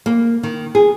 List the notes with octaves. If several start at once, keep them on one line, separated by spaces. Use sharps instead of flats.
A#3
D#3
G#4